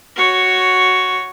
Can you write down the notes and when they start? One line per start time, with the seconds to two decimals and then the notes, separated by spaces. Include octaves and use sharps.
0.16 F#4 C#5